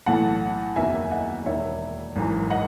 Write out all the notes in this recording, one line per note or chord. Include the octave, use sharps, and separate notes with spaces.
B1 A2 E3 F#5 A5
F#1 E2 D#3 F#3 E5 G#5
D#5 F#5
E1 D#2 D#3 C#5 E5
G#1 F#2 E3
D#5 F#5